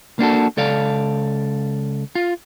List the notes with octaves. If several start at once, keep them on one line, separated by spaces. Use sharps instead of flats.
A#3 D4 F#4 A4
C#2 A4 D5 F5
F4